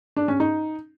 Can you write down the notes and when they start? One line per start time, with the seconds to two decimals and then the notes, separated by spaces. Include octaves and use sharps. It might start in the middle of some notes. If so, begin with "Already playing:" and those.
0.16 D4
0.28 C#4
0.40 D#4